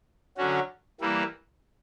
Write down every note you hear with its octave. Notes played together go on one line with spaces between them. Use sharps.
D3 F#3 C#4 F#4
E3 G3 A#3 E4